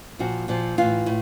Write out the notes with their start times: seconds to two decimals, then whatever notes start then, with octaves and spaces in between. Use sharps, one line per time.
0.19 A#2 F3 F#4
0.48 A#2 F3
0.78 A2 E3 F4
1.06 A2